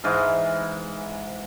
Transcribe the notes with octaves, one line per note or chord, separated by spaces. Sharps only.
G#2 E3 G#3 F5